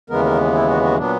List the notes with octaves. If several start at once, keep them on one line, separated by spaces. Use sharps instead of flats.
D#2 C#3 E3 G#3 B3 A#4
A#4
E4
F#4
F#4
A#2 F#3 B3 D4